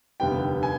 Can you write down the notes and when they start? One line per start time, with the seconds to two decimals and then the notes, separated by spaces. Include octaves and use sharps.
0.20 F1 D#2 D3 G3 B3 G5
0.63 G#5